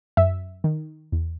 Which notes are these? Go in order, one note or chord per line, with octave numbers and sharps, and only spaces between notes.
F#2 E5
D#3
E2